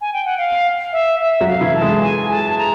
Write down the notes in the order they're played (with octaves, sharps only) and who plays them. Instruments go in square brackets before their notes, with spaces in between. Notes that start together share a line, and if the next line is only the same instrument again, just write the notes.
[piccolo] G#5
G5
F#5
F5
E5
E5
[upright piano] F#3 F#4
[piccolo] F5
[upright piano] E3 E4
[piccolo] A5
[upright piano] G#3 G#4
[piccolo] G#5
A5
A5
A#5